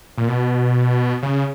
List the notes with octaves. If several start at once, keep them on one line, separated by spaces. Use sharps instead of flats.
A#2
B2
C#3